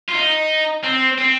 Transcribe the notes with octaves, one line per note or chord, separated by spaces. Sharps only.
F4
D#4
C4
C4